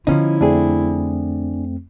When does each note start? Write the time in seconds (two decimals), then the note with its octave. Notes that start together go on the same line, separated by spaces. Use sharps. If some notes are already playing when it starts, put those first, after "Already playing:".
0.07 D3 F3 B3 C#4 D#4 E4
0.41 F2 A3 C4 D4 G#4